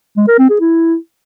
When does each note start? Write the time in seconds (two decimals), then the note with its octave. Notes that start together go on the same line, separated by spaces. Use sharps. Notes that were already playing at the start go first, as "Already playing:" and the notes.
0.17 G#3
0.28 A#4
0.39 C4
0.50 G#4
0.61 E4